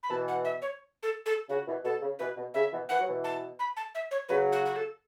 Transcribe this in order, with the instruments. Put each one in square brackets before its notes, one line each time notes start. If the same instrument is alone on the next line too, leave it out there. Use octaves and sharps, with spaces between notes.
[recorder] B5
[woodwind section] B2 E3 [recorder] A5
[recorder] F#5
E5
C#5
A4
A4
[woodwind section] C#3 [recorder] F#4
[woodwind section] B2 E3
[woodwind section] B2 [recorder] A4
[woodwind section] C#3
[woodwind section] B2 E3 [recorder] B4
[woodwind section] B2
[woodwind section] C#3 [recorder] E5
[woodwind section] B2 E3
[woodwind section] E3 [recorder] F#5
[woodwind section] F#3
B2 E3
[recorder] A5
B5
A5
E5
C#5
[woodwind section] C#3 F#3 [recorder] B4
[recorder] F#4
F#4
A4